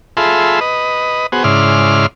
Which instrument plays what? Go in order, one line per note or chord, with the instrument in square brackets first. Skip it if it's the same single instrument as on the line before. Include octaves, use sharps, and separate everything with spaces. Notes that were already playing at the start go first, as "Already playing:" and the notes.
[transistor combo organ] F4 G#4 A4 E5 B5 C6
B4 D#5
B3 F#4 G#4 C5
G#2 C#3 E4 D5 C6 F6